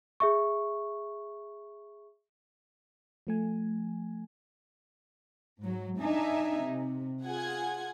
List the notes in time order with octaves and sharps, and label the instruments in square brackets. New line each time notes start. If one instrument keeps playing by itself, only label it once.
[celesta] G#4 E5 C#6
[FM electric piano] F3 A3 G#5
[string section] G#2 F#3
D4 D#4 E5 G#5
C3
F4 G#4 F#5 G#5 G#6